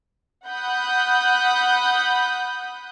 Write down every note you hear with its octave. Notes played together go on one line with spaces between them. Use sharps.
F#5 B5 D#6 F#6 G6